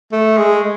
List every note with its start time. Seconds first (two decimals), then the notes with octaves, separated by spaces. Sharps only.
0.12 A3
0.38 G#3